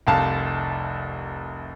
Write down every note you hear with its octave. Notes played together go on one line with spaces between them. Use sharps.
F1 C2 F5 A5